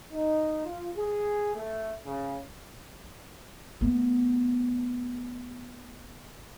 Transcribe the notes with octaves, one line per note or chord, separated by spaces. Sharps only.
D#4
F4
G#4
A3
C#3
A3 B3